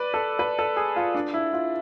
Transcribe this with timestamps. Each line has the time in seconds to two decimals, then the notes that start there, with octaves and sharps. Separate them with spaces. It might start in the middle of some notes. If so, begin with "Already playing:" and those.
Already playing: B4 D5
0.14 A4
0.39 B4
0.59 A4
0.77 G#4
0.96 F4
1.15 D4
1.34 E4
1.53 F4